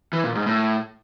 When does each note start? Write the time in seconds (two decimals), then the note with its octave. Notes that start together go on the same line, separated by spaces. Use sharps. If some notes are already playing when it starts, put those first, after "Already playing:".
0.13 E3
0.24 A#2
0.35 G#2
0.46 A2